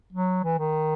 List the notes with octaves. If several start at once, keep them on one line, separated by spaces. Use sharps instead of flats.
F#3
E3
D#3